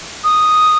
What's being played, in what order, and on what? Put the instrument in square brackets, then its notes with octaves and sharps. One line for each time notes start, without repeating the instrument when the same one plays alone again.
[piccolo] D#6